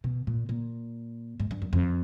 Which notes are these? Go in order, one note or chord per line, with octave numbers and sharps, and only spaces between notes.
B2
A#2
A#2
G#2
G2
F#2
F2